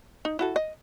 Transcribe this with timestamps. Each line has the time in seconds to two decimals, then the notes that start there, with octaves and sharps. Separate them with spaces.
0.25 D#4
0.39 E4 F#4 A4
0.56 D#5